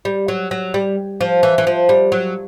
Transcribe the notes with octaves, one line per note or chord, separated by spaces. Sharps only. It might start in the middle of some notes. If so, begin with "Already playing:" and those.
G3
F#3
F#3
G3
F3
E3
E3
F3
G3
F#3